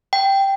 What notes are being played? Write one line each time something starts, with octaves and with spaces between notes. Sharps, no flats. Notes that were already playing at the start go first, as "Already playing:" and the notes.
G5